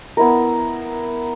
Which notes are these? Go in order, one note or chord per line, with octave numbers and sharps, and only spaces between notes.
B3 E4 A#4